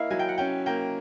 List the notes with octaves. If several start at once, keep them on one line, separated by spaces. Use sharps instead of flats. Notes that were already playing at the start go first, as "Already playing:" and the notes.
Already playing: A#3 E4 A#4 D#5 F5
F#3 G#5
G5
F#5
C#4 G5
A#3 G5